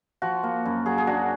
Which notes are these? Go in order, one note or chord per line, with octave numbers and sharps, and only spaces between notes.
F3 F#4
A#3
F#2
F#3 G#4
G#4
D4 F#4